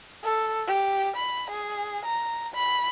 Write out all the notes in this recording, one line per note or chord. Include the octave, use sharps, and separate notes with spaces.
A4
G4
B5
G#4
A#5
B5